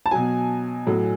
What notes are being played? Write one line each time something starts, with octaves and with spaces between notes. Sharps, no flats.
A5
B2 F#3 G#5
A2 F#3